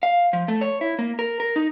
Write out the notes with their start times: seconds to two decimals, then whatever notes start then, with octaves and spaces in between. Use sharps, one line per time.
0.03 F5
0.33 F3
0.48 A3
0.61 C#5
0.81 E4
0.99 A#3
1.19 A#4
1.40 A#4
1.56 D#4